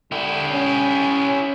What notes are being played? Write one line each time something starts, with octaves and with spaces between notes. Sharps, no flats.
D3 E4 G4
C#4